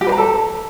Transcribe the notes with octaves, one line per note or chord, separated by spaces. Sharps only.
G4
B4
A#5
A4